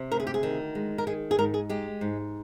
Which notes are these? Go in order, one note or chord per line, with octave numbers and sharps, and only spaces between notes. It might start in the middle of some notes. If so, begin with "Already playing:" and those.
Already playing: C3
D2 A#4
G#4
G4
G#4
D#3
G#3
A#4
D#3 G#4
G#4
G#2 A#4
G#4
G#3 G4
G#2